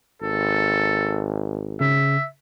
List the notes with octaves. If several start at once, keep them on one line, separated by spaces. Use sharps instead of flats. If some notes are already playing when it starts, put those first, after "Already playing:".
G#1 A4
C#3 E5